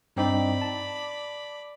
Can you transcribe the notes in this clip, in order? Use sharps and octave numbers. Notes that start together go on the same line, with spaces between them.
G2 C4 D#4 D5 B5
A5